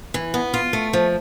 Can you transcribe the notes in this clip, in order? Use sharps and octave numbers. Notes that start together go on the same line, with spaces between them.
E3
B3
F4
A3
F3